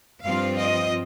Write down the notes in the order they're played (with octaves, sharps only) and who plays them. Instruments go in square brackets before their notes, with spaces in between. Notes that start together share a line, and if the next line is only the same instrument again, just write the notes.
[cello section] G2 F3 C4 F4 F5
D#5